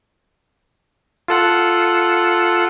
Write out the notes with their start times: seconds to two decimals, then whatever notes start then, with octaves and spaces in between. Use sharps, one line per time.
1.28 F4 A4 F#5